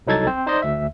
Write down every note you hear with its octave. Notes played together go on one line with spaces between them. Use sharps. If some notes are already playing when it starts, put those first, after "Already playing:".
C2 F#3 D#4 A4 G#6 A6
C4 C5
D#4 C5 D5 D#5
D2 E5